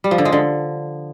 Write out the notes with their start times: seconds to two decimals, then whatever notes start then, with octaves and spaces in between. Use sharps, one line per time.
0.04 G3
0.11 F3
0.18 D3
0.25 G#3
0.32 D3